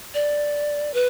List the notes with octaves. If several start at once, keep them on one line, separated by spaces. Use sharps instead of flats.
D5
B4